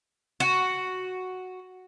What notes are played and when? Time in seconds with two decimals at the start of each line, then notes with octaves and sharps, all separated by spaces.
0.40 F#4